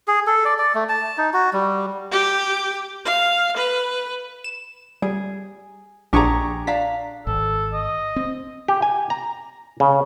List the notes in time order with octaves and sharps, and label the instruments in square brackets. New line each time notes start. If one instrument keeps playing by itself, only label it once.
[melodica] G#4
A4
D5
D5
A3
A5
D#4
F#4
G3
[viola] G4
F5
B4
[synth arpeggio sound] E7
[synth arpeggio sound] G3 [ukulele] G#4
[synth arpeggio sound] A#1 D4 C#6 [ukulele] G4 G#4 A#5
[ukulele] D4 F5 A#5 [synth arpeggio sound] B6
[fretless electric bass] G#1 [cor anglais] A4
[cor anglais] D#5
[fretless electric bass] C4
[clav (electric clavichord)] G4
G#5
A#5
C#3